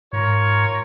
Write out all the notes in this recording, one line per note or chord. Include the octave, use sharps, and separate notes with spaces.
G#2 F4 A#4 C#5